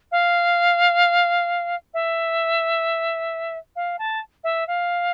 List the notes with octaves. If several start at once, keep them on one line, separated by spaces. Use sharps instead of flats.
F5
E5
F5
A5
E5
F5